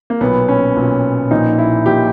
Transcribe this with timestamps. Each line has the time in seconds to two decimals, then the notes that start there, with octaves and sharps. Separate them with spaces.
0.10 A#3
0.20 B1 A#2 B3
0.48 C#4
0.76 B1 A#2
1.30 A#1 A#2 D#4
1.58 E4
1.86 A#1 A#2 G4